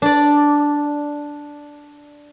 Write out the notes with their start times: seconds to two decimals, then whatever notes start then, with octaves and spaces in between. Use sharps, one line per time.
0.02 D4 D5